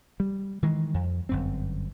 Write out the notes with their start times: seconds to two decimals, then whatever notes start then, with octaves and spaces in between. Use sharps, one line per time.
0.20 G3
0.63 D#3 E3 G#3
0.94 F2
1.29 G1 F#2 C4